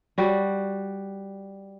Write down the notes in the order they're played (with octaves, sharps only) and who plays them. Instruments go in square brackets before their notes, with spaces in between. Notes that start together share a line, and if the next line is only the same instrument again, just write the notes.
[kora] G3 F#4